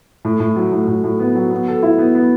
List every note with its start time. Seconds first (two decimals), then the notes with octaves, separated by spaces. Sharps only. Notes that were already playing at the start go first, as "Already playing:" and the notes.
0.25 A2
0.40 A2
0.56 F#3
0.72 A2
0.88 A2
1.04 A2
1.20 B3
1.35 F#3
1.51 B3
1.68 A4
1.83 E4
1.98 B3
2.15 B3